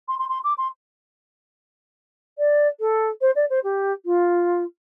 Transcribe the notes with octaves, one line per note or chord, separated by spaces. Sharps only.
C6
C6
C6
D6
C6
D5
A4
C5
D5
C5
G4
F4